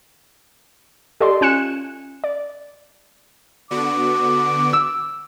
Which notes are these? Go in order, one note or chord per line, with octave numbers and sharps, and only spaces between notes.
G4 A4 D5 D#5 C6
C#4 F4 G#5 F#6 C#7 E7
D5
D3 B3 F#4 D6
E6